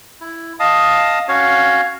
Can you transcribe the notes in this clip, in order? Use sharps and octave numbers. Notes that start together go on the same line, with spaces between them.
E4
D#5 F5 A5 D#6
C#4 F#4 C#5 F5